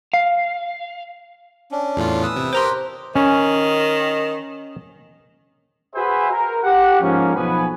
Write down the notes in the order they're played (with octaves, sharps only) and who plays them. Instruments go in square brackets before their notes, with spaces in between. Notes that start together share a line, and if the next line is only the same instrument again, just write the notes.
[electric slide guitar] F5
[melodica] C#4 D4
[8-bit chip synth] E2 A2 F4
[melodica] B4 D#6 E6
[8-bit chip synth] C3
[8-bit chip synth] G4 A#4 G5 [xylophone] C5 A#5 C6
[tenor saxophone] D#3 [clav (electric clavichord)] C#4
[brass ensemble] F#4 G#4 B4 C5 E5 G#5
A#4
G4 F#5
G#2 F3 A#3 C#4
B1 F3 B3 B4 G#5